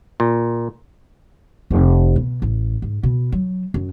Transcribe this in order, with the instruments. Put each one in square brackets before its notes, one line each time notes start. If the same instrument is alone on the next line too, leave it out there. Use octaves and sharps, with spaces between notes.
[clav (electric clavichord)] A#2
[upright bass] F1
B2
A1
G#2
B2
F#3
F#2